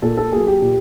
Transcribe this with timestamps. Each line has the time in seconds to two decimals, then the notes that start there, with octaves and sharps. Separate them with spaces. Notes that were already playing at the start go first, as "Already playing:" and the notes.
0.02 A#2 A4
0.17 A4
0.32 F#3 A#3 G#4
0.47 G4
0.62 A#2